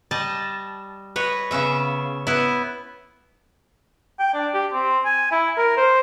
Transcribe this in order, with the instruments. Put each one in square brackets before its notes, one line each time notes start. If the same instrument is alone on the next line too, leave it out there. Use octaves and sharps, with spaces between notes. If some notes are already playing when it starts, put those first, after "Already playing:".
[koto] G3 D#5 A5
B4 C#5 D#5
C#3 B3 C#4 E5
B3 E4
[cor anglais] G5
D4
G4
C4
G#5
E4
A#4
C5